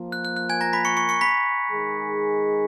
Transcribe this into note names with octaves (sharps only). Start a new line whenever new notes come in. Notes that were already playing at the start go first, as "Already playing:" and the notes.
Already playing: F3 A#3 F4
F#6
F#6
F#6
G#5 G#6
A#5 A#6
B5 B6
C#6 C#7
C#6 C#7
C#6 C#7
B5 B6
D#3 G#3 D#4 G#4